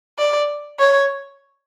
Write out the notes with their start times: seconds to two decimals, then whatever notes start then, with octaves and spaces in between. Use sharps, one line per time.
0.18 D5
0.79 C#5